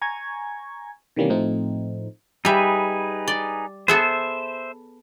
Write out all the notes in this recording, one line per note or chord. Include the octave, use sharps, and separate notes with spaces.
G#5 A#5 C#6 G#6
C3 D#3 E3 G3 A#3 C#4
A2 F3 A3 C4 D#4
G3 D#4 G#4 B4 E5
D5
B3 G#4 A4 C5 E5